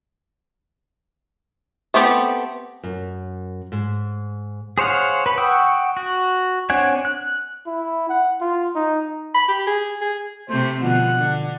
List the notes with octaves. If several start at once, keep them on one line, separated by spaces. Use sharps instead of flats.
A3 B3 C4 G4 A4
F#2
G#2
G#4 C5 C#5 F5 F#5
B4 B5
F#5 G5 C#6 D#6 E6
F#4
C4 D4 C#5 F#5 G#5
F#6
E4
F#5
F4
D#4
B5
G4
G#4
G#4
C3 A3 C5
B2 D3 F3 F#5
D3